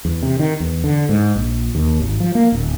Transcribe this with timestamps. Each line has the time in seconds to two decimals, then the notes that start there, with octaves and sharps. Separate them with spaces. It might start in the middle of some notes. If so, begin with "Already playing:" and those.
0.05 E2
0.23 C3
0.39 D#3
0.60 E2
0.84 D3
1.09 G#2
1.35 A#1
1.75 D#2
2.00 G#1
2.20 F3
2.35 A#3
2.52 D1